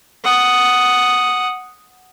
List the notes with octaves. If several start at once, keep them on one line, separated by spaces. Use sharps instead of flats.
F#5 D#6